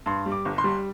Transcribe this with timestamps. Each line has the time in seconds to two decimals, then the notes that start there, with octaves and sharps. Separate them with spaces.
0.06 G2 C6
0.26 G3
0.32 D6
0.45 G1
0.58 C6
0.64 G3